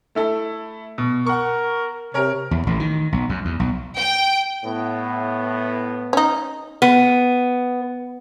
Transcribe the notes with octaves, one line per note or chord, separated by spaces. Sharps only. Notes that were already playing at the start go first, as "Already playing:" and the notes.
A3 E4 A4
B2
A#4 F#5 C#6
C3 A#4 C#5
E2
A1
D#3
B1
F#2
E2
B1
G5
A2 B3
C#4 D#4
B3